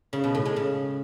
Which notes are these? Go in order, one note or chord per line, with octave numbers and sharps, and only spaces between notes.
C#3
B2
A2
G#3
C#3